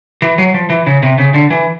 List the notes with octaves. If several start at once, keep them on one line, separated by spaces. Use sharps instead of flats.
E3
F#3
F3
E3
C#3
C3
C#3
D3
E3